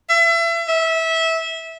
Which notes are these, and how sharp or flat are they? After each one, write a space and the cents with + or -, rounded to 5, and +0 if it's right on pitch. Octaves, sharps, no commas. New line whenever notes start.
E5 +30
E5 -20